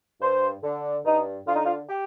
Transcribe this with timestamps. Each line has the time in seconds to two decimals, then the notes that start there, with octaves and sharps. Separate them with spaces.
0.21 G2 C5
0.63 D3
1.05 G2 D#4
1.47 D3 F4
1.55 D#4
1.64 F4
1.89 G4